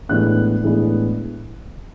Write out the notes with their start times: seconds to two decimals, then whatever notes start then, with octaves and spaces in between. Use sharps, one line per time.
0.09 A2 E3 G#3 B3 D4 F#6
0.63 A2 E3 G#3 B3 D4